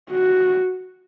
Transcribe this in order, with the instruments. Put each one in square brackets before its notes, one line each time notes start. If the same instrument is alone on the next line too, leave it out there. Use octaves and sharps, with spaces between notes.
[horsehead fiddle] F#4